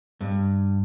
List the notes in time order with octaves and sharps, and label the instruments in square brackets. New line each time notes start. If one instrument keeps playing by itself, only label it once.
[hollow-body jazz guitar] G2